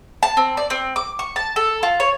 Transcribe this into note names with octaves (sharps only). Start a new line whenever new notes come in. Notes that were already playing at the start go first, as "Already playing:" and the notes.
A5
C4
D5
C4
D6
C#6
A5
A4
F4
C#5